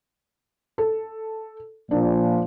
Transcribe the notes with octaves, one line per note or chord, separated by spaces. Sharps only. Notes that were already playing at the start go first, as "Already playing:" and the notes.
A4
A#2 F3 D4